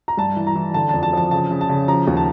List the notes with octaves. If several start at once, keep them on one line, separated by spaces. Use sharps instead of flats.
A#5
G2 A5
E3
A#5
E3
D3 A5
F2 A5
A5
F3 A5
C#3 A5
C#3
A5
C#3
F3 A#5
D#2
A5